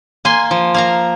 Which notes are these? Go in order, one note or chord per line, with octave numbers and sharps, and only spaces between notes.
A#3 G#5 C6
F3
A#3 F5 A#5